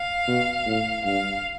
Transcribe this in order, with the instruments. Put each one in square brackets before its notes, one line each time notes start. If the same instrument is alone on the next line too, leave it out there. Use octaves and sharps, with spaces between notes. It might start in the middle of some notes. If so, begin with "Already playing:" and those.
Already playing: [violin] F5
[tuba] B2
A2
[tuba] G2 [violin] F5